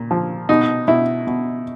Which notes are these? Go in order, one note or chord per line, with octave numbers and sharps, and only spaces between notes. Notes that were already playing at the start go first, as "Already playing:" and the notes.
Already playing: A#2
F3
B2 D#4
B2 E4
B2